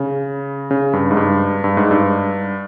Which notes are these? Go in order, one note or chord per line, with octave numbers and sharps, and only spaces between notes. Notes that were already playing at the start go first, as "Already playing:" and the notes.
Already playing: C#3
C#3
G2
G#2
G2
G2
G#2
G2